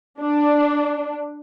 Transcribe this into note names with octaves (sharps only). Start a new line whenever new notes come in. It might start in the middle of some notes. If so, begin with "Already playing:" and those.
D4